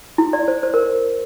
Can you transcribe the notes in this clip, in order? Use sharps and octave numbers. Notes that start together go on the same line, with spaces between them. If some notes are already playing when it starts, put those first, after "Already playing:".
E4
D5
C5
C5
A#4